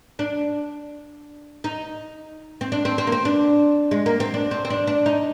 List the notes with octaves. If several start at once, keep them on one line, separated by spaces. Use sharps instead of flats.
D4
D#4
C4
D4
C4
C4
A#3
C4
D4
G#3
A#3
C4
D4
C4
C4
D4
D4
D#4